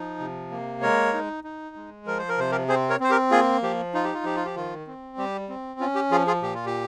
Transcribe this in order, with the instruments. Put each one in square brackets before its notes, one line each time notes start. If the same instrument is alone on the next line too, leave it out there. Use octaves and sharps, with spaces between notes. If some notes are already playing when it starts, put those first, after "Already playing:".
Already playing: [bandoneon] F3 D#4
C3
A#3
G#3 A#4 C#5
D#4
D#4
G#3
F3 A#4
C5
A#4
C3 C5
G4 A#4
C4 G#4 C5
A#4 C#5
C4 C5
G4 A#4
A#3 F4 G#4
F3 G4
D#4 F4
G4
F4
F3 G4
F4
G4
D#3 F4
C4
G3 G4
C4
C#4 F4
G4
F3 F4 G#4
F4 G#4
A#2 G4
F4
G4